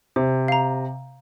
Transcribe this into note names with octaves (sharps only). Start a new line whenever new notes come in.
C3 C5
F5 A#5